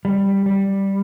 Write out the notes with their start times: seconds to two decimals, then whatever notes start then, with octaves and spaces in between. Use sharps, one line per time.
0.05 G3
0.46 G3